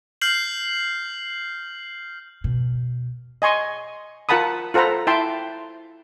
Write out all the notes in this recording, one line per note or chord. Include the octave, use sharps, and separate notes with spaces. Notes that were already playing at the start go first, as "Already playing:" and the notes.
F6 G6 C7 F#7
B2
D#5 G#5 C6 C#6
F4 A#4 F#5 A5 B5 D#6
F4 A4 C5 F#5 A#5 B5
E4 E5 G5 A5 C6